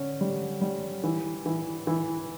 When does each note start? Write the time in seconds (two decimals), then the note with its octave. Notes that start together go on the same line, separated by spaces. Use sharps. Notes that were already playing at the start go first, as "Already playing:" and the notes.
Already playing: D3 C#4
0.21 G3
0.62 G3
1.04 E3
1.46 E3
1.87 E3